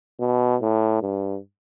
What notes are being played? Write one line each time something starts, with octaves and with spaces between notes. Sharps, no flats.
B2
A2
G2